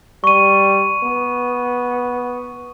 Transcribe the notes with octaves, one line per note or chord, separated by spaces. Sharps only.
G3 C#6 D#7
B3